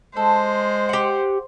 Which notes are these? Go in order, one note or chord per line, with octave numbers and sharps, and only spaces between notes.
G#3 A4 C5
G4 F#5